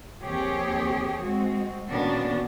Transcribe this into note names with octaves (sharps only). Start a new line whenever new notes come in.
D#2 F3 C4 G4 G#4 C#5
G#3 C4 F#4
A#2 D#3 B3 C#4 D4 F#4